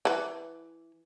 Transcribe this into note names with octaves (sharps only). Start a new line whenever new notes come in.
E3 B4